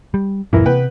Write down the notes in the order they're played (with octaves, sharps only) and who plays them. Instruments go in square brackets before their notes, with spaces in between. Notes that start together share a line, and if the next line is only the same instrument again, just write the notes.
[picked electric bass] G3
[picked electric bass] D1 F#2 A#2 [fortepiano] E3 A#3 E4
[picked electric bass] C3 [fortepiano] B3 B4 G5